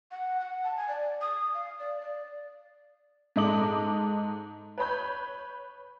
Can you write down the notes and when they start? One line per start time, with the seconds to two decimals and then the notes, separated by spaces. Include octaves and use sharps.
0.11 F#5
0.41 F#5
0.64 A5
0.77 G#5
0.88 D5
1.21 D#6
1.54 F5
1.79 D5
2.01 D5
3.36 G#2 A4 D#5 D6 F#7
4.78 B4 C#5 B5 G6